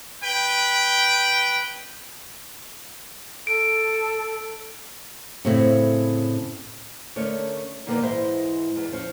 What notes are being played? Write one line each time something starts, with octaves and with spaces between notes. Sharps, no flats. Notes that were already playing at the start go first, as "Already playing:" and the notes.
B4 G5
A4 D7
A2 C#3 C4 E4
D3 A3 C#4 A#4 C#5
A#2 D3 D#3 F3 A#3 B3
G#2 E3 G#3 E4 C5 E5
E2
F3 C#4